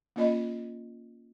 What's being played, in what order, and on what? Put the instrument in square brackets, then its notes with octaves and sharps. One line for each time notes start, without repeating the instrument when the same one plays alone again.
[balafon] A#3 C#4 F4 D5 D#5 B5